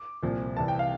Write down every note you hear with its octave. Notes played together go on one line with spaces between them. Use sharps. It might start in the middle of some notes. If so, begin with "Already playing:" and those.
Already playing: D6
C2 A#2 F3
C2 C3 E3 A5
G5
F5